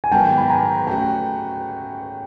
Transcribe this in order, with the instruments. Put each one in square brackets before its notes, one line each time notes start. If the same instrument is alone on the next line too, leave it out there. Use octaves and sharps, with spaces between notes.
[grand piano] G#5
[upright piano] G#2 D#3 F#3 B3 [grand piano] G5 A5
[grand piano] B5
G#5 A#5
[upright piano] A3 C#4 F#4 [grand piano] G5 A5